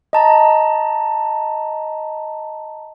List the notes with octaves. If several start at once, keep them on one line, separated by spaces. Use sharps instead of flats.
D#5 A5 A#5